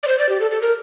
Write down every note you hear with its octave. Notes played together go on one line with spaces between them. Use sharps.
D5
C5
D5
G4
A4
A4
A#4